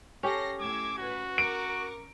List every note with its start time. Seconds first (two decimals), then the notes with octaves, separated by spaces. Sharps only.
0.23 C#4 G4 A4 A#6 C7
0.60 A2 D6 E6 G#6
0.98 F#4 B4
1.38 A#4 C#6 D6 D7